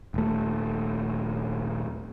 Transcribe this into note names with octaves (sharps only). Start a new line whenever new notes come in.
D#1 A3